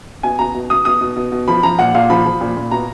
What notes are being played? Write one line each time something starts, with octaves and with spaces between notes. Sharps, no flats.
B2 G#5
B2 A#5
B2
B2 D#6
B2 D#6
B2
B2
B2
F3 B5
F3 A#5
A#2 F#5
A#2 F5
F3 B5
F3
A#2
A#2
B2 A#5